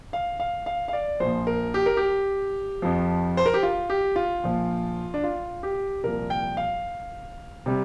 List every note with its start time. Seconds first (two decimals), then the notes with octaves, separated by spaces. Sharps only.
0.13 F5
0.40 F5
0.66 F5
0.88 F5
0.93 D5
1.20 A#1 A#2 F3 C5
1.47 A#4
1.74 G4
1.86 A#4
1.97 G4
2.82 F2 F3
3.37 C5
3.46 A#4
3.54 G4
3.63 F4
3.90 G4
4.16 F4
4.43 A#1 A#2 F3
5.14 D4
5.24 F4
5.63 G4
6.04 C2 A#2 F3 A#4
6.30 G5
6.57 F5
7.66 C3 G3